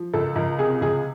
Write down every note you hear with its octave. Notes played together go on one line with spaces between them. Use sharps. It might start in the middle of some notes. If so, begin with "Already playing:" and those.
Already playing: F3
C#2 A4
C#2 A#4
C3 G#4
C#2 G#4